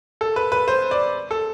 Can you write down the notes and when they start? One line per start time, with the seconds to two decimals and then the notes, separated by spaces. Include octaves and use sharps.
0.21 A4
0.36 B4
0.52 B4
0.68 C5
0.91 D5
1.31 A4